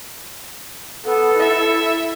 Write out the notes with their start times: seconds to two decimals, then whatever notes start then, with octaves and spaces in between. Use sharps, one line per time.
1.05 B3 A4
1.37 E4 E5